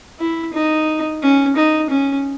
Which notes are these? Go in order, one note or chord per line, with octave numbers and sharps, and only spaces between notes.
E4
D#4
C#4
D#4
C#4